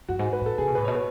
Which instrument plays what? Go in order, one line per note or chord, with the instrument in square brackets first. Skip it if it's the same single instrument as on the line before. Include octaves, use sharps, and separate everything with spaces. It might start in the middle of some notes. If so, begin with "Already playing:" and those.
[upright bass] F#2 [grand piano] F#4
[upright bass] G#2
[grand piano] B4
[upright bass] A2 [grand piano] A4
[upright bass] C#3 [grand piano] G#4
[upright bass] B2
[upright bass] A2 [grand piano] B4
[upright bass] B2 [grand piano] C#5
[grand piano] B4